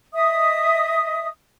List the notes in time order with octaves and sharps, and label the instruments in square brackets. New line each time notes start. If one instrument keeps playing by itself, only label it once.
[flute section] D#5 E5 D#6